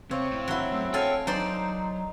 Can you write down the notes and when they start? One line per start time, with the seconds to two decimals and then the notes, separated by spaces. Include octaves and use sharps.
0.11 C3 C4 C#5 F5
0.32 A2
0.48 F#3 E4
0.72 F#2 A3
0.94 A4 C#5 F5 G5 G#5
1.27 F#3 D#4 C5 D5 A#5